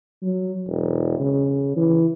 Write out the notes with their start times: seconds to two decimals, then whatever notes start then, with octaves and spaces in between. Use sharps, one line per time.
0.22 F#3
0.67 E1
1.20 C#3
1.77 E3